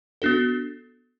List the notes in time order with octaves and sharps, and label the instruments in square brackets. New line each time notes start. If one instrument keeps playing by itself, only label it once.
[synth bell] B3 D4 F#4 A4